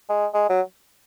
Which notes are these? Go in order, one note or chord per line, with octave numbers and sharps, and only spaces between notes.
G#3
G#3
F#3